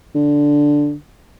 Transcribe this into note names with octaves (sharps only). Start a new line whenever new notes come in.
D3